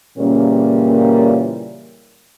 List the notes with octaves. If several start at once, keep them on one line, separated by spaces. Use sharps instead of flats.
A#2 C#3 E3 G3 A#3 C#4